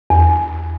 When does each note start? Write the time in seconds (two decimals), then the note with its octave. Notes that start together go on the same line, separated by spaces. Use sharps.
0.10 E2